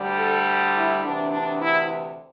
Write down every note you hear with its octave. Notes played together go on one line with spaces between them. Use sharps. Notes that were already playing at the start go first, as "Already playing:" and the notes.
Already playing: D2 D3 G3
A4
E4
D2 C3 E3 D4
D4
E4